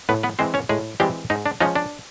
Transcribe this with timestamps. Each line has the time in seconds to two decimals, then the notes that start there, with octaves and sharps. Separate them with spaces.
0.09 A2 B3 B4
0.23 B3 B4
0.39 E3 G#3 C4 C5
0.54 C#4 C#5
0.69 A2 G#3 G#4
1.00 E3 G3 G#3 C4 G4
1.30 G#2 D#4
1.46 D4
1.60 F3 G#3 C#4 D#4
1.76 D4